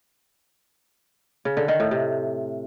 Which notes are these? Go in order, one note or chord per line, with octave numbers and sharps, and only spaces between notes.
C#3
D3
D#3
A2
C3